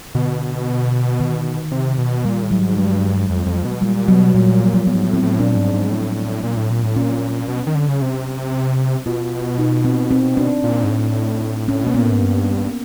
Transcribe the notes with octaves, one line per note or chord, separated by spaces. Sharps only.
B2 D3
D#3
C3
B2
A#2 G3
A2
F#3
G#2
G2 G#3
F2
F2
B2
A#2 G3
B2 F#3
A#2 G3
G3
F3
F3
A#2 B3
G#2
A2
C4
A2
A#2 D4
G#2
G#2
A2
A#2
A2
A#2
A2
A#2 C#4
B2
D#3
D3
C#3
C3
B2 F4
D#4
C4
C4
D4
A#2
G#2
A2
C#4
B2 A#3
A#2 B3
A2
G#2
G2